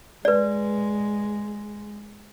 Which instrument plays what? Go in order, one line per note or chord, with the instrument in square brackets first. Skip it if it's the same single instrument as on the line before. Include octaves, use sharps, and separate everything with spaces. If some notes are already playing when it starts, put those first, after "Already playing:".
[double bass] G#3 [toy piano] B4 D5